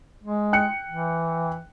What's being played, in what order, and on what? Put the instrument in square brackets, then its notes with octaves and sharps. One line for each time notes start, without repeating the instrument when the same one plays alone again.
[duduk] G#3
[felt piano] G5 F#6 C#7
[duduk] E3